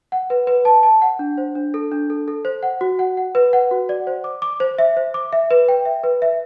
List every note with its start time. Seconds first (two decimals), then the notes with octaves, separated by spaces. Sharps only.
0.12 F#5
0.30 B4
0.47 B4
0.65 A5
0.83 A5
1.02 F#5
1.19 D4
1.38 C5
1.55 D4
1.74 A4
1.92 D4
2.10 A4
2.28 A4
2.45 C5
2.63 F#5
2.81 F#4
2.99 F#5
3.17 F#5
3.35 B4
3.53 F#5
3.71 F#4
3.89 D5
4.07 C5
4.24 D6
4.42 D6
4.60 C5
4.79 E5
4.97 C5
5.14 D6
5.33 E5
5.51 B4
5.68 G5
5.86 E5
6.04 B4
6.22 E5